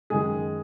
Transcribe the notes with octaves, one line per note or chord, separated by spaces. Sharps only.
F#2 D#3 G#3 G#4